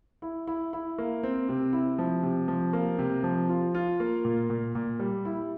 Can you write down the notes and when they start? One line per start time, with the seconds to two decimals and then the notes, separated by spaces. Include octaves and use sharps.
0.22 E4
0.47 E4
0.73 E4
0.98 A#3
1.23 C4
1.49 C3
1.73 E4
1.99 F3
2.23 C3
2.48 F3
2.73 A#3
2.99 C3
3.23 F3
3.49 F4
3.75 F4
4.00 A#3
4.25 A#2
4.50 A#2
4.75 A#2
4.99 G3
5.25 E4